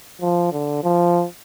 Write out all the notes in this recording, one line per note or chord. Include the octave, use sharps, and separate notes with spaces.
F3
D3
F3